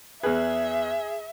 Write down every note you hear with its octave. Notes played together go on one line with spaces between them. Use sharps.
E2 G#4 B4 E5